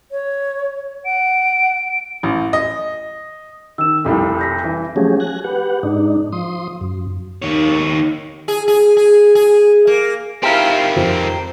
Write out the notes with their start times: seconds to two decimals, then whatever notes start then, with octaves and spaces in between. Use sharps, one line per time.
0.12 C#5
1.05 F#5 D7
2.23 A1
2.53 D#5
3.78 D#3 E6 E7
4.05 F1 C2 G3 E4 F4 A4
4.39 G6 A#6 B6
4.64 E3
4.96 F3 F#3 A3 C#4 G4 G#4
5.20 G#5 F#6 A#6
5.44 G4 B4 F#5
5.83 G#2 D4 D#4
6.32 F3 C6 D#6
6.81 F#2
7.42 D#2 D#3 C#5
8.48 G#4
8.68 G#4
8.97 G#4
9.35 G#4
9.87 A#3
10.43 D#3 C4 E4 F4 G4 A#4
10.96 F2 C5